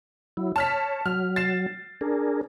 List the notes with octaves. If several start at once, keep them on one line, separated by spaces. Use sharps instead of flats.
F#3 E4
C#5 A5 F6 B6
F#3 F6
A6 C7 E7
D4 G#4 A#4